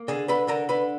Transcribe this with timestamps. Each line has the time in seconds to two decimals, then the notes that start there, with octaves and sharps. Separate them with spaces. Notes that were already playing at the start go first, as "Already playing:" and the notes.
Already playing: A#3
0.08 D3 G#4 G#5
0.28 D3 B4 B5
0.48 D3 A#4 A#5
0.69 D3 B4 B5